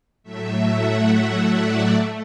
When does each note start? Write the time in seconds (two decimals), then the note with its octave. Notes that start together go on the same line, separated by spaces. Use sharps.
0.23 A2 F#3 A3 E5
0.66 F#5
1.08 E5
1.51 D5
1.93 A3